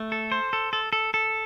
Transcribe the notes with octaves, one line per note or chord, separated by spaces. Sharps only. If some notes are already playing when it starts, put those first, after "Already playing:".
Already playing: A3
A4
C5
A4
A4
A4
A4